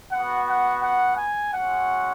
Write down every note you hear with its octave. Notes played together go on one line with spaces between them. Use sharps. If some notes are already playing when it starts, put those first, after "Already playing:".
B3 F#4 F#5
F#5
F#5
G#5
G#3 C#4 F#4 F#5